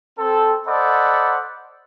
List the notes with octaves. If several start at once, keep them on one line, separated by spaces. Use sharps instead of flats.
C4 A4
A4 C5 D5 D#5 F#5 B5